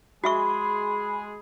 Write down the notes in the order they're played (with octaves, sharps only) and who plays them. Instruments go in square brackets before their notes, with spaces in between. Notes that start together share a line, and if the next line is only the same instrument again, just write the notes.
[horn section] G#3 G#4 [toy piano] F#4 E5 C#6 [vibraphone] B5